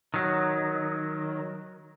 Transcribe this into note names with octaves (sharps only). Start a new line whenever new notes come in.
D#3 F#3